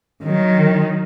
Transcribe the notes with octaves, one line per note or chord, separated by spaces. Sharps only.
D#3 F#3